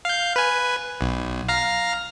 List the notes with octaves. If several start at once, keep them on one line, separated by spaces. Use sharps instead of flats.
F5 G6
B4 G#5
B1
F5 A#5 F6